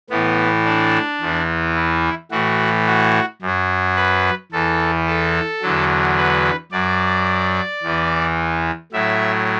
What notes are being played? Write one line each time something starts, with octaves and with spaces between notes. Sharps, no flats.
A2 E3 B3
D4
E2 E3
E4
A2 E3 F#4
F#4
F#2 F#3
B4
E2 E3 A4
A4
E2 D3 F#3
B4
F#2 F#3 D5
E2 E3
A2 F#3 E5